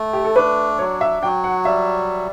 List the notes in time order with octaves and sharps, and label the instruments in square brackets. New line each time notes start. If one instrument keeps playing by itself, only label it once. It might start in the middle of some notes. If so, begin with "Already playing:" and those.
Already playing: [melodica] A3
[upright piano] G4
A4
[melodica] D4 [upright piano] B4
[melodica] F#3 [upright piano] C#5
[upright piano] E5
[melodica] F#3 [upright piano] G5
[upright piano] F#5
[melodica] G3 [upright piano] E5